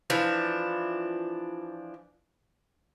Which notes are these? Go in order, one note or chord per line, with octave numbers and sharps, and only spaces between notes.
E3 F3 D4